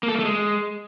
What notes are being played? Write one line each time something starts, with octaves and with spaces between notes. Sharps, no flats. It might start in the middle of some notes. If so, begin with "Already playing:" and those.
A#3
A4
A#3
A3
G#3